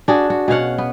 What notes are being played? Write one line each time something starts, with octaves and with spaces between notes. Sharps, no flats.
D4 F#4 G#4
F#4
B2 C#4 F5 F#5
B3